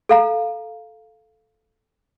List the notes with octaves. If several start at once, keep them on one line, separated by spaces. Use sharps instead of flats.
A4 F5 A#5